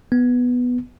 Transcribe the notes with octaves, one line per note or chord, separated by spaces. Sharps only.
B3